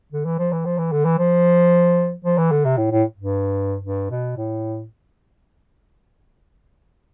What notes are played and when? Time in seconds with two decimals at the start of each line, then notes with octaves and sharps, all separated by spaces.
0.12 D3
0.25 E3
0.39 F3
0.52 E3
0.65 F3
0.78 E3
0.92 D3
1.05 E3
1.19 F3
2.24 F3
2.38 E3
2.52 D3
2.65 C3
2.77 A2
2.91 A2
3.18 G2
3.84 G2
4.10 B2
4.37 A2